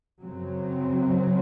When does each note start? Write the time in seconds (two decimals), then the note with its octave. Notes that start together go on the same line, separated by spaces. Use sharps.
0.21 F#2 C#3 F#3 C4